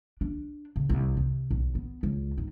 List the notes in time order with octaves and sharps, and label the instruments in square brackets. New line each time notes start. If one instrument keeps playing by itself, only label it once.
[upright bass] D4
C#3
C2
C3
B1
B3
C#2
G#2